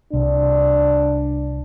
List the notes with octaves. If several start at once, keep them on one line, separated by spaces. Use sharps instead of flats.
C2 D4